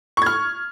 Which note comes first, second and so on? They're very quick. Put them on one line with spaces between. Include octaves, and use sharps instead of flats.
C#6 G#6 F6